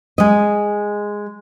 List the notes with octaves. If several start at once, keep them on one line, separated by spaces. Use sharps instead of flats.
G#3 D#5